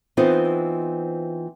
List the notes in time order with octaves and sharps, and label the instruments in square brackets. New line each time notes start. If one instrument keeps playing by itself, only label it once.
[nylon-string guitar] E3 B3 C4 D#4 F4 C5